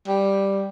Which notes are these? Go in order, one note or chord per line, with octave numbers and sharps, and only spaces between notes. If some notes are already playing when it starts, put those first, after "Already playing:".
G3